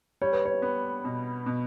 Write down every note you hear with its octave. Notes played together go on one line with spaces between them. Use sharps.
G3 C#5
B4
C#5
B3
B2
B2